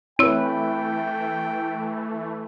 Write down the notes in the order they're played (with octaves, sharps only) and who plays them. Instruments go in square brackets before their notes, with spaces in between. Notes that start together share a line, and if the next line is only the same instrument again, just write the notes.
[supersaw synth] E3 A3 [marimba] C4 C#5 E6 [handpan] E4 B4 [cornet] G5